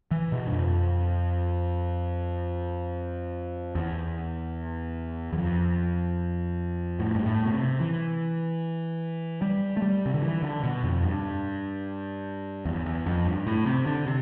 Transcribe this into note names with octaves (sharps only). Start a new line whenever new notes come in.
E3
B2
G2
F2
E2
E2
F2
A2
G2
A2
B2
C3
E3
G3
A3
G3
C3
D3
E3
D3
B2
F2
G2
E2
E2
F2
G2
A2
C3
D3
C3